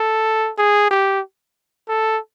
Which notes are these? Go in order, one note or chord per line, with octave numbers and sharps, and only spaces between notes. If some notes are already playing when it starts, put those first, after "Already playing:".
Already playing: A4
G#4
G4
A4